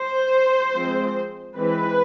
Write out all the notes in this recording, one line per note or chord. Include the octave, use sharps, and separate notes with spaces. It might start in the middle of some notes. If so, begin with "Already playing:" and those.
Already playing: C5
F3 G#3 C4
E3 G#3 C4 B4